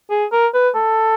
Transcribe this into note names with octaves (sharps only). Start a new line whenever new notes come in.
G#4
A#4
B4
A4